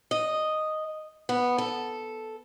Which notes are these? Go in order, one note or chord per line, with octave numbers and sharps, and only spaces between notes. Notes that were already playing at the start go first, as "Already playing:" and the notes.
D#5
B3
A4